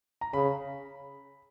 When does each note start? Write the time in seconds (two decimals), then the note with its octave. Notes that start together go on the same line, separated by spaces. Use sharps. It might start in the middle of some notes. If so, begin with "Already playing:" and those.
0.21 A#5
0.33 C#3 B5